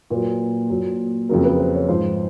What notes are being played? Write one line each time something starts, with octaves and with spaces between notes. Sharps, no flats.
A#2 F#3 B4
A#2 F#3
F2 C#3 F#3 A#4
B4
C5
C#5
G#2 F3 C5